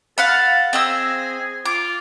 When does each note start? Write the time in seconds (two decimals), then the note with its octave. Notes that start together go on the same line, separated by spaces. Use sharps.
0.18 A4 F5 F#5 B5
0.73 C4 G#4 D#5 E6
1.65 F4 D6